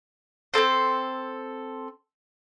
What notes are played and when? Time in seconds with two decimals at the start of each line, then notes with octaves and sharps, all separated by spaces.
0.54 C4 D#4 A4 C5